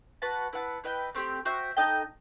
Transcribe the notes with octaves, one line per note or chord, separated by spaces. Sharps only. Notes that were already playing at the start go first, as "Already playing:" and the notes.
F#4 B4 F#5 A5
E4 B4 F#5 A5
E4 B4 D#5 G5
A3 C4 D#4 G4
F#4 C5 E5 G5
D#4 A4 D#5 G5